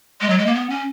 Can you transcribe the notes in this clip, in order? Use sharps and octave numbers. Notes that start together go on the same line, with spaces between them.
G#3
F#3
G#3
A#3
B3
C#4